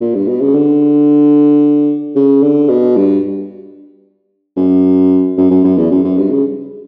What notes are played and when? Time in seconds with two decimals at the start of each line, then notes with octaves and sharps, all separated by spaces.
0.01 A#2
0.15 G2
0.28 B2
0.41 C#3
0.54 D3
2.16 C#3
2.42 D3
2.69 B2
2.96 G2
4.56 F#2
5.37 F#2
5.51 F#2
5.64 F#2
5.78 E2
5.91 F#2
6.04 F#2
6.18 G2
6.31 C#3